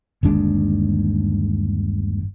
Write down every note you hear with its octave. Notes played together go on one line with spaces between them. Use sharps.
G1 D#2 G#3 D4